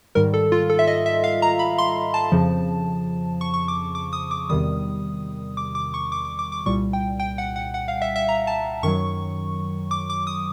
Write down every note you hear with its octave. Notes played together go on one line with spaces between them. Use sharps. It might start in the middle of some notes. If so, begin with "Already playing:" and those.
G#2 D#3 G3 A#4
A4
F4
A4
E5
D#5
E5
F5
A#5
B5
C6
A5
F2 C#3 F3
C#6
C#6
D6
D6
D#6
D6
E2 C3 D#3 G3 D#6
D6
D6
C#6
D6
D6
D6
D6
C2 A#2 G3 C#6
G5
G5
F#5
F#5
F#5
F5
E5
E5
A#5
A5
F#2 D#3 F#3 C#6
D6
D6
D#6